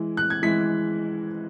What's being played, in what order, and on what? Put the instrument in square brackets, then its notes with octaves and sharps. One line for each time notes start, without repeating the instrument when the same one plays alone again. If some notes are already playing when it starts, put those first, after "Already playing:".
Already playing: [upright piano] E3 G#3 E4
F#6
G#6
E3 G#3 E4 B6